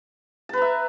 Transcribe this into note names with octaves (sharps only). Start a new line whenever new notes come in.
B4 E5 A5 A#5